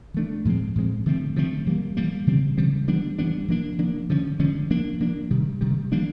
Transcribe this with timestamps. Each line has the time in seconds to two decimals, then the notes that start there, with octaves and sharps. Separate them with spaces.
0.14 E3 A3 D4
0.45 A2 F3 G#3 C4
0.75 A2 F3 G#3 C4
1.06 D3 F3 A3 C4
1.36 D3 F3 A3 C4
1.66 E3 G3 A#3
1.97 E3 G3 A#3
2.27 C#3 E3 G3 C4
2.57 C#3 E3 G3 C4
2.88 E3 G3 B3 D4
3.19 E3 G3 B3 D4
3.48 F3 A#3 D4
3.79 F3 A#3 D4
4.10 D3 F3 G#3 C#4
4.39 D3 F3 G#3 C#4
4.70 F3 A#3 D4
5.00 F3 A#3 D4
5.31 C3 D#3 G3
5.61 C3 D#3 G3
5.92 E3 G3 A#3 D4